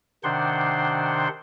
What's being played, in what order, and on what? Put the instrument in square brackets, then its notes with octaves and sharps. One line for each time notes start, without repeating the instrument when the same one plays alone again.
[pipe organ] C3 D#3 D4 C5 F#5 C6